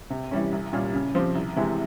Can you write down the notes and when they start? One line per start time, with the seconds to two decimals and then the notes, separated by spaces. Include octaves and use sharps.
0.10 C3
0.31 E3 G3 C#4
0.52 C2
0.73 A#2 G3 C#4 F4
0.93 C#3
1.15 F3 C4 G4
1.35 C2
1.56 C3 E3 G#3